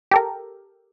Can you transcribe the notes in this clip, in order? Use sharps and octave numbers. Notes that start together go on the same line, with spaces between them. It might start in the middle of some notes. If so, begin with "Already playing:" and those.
G4 A4 A#4